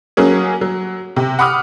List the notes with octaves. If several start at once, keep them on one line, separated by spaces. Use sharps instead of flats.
F#3 A#3 C#4 G#4
F#3
C3
F#5 B5 D6 D#6 F6